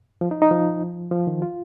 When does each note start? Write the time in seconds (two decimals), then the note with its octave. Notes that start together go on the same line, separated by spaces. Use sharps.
0.21 F3
0.31 D#4
0.42 D#4
0.51 F3
1.12 F3
1.27 D#3
1.42 F4